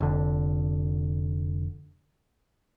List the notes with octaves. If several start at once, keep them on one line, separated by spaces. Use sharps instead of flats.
F1 D3